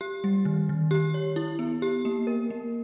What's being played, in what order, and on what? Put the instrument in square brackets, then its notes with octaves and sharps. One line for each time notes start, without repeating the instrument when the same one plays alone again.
[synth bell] G4
G3
D#3
D#3
G4
C#5
E4
B3
G4
A#3
A#4
A#3